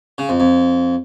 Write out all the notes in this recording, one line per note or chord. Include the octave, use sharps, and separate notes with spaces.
C#3
F2
F2